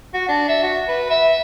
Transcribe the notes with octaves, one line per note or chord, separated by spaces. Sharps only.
F#4
D4
E5
F#4
B4
E5